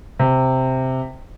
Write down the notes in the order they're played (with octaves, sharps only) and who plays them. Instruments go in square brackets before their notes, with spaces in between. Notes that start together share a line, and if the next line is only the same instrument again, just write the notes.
[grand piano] C3